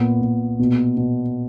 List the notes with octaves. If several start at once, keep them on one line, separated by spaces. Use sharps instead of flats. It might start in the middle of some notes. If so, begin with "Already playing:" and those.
Already playing: A#2 B3
A#2
B2
B2